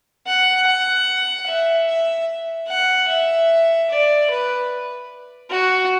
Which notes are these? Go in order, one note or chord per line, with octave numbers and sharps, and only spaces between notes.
F#5
F#5
E5
E5
F#5
E5
D5
B4
F#4